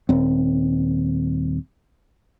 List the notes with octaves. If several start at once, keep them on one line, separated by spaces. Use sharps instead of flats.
D#1 C4